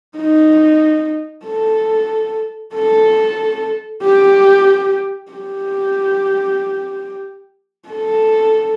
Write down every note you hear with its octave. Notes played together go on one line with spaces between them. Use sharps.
D#4
A4
A4
G4
G4
A4